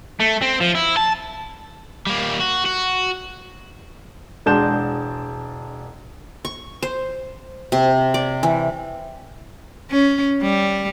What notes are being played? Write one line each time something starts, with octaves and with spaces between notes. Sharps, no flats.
A3
C4
F3
E4
A5
G3 A#3
F#4
F#4
E1 G#3 D4 A5 G6 E7
C#6
C5
C3
D5
E3
C#4
G3